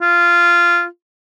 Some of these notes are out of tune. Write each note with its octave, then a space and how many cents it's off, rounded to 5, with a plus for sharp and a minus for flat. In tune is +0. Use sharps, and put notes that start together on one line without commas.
F4 -15